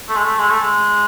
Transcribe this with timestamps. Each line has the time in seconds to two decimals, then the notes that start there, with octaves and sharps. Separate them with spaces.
0.08 A3
0.15 G#3
0.23 A3
0.38 G#3
0.49 A3
0.60 G#3